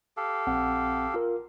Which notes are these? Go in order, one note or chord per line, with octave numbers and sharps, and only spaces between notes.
G4 A4 F5
A#1 C4 F#5
F4 A#4